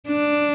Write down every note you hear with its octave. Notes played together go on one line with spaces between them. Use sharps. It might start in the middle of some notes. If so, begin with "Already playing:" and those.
D4